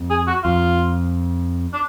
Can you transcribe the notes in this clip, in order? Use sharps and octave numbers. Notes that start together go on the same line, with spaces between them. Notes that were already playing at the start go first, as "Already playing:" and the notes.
Already playing: F2
G#4
F#4
F2 F4
D4